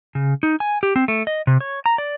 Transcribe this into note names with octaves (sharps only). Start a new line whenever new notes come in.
C#3
D#4
G#5
G4
C4
A3
D#5
C3
C#5
A#5
D5